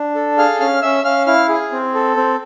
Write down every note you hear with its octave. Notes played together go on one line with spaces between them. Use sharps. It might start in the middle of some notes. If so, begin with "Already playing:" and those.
Already playing: D4
A4
G#4 F5 F6
C#4 F5 F6
C#4 E5 E6
C#4 F5 F6
E4 F5 F6
G#4
C4
A4
C4